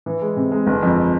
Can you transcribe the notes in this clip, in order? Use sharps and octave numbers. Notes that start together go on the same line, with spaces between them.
E3
G#3
C3
G#3
G1
F2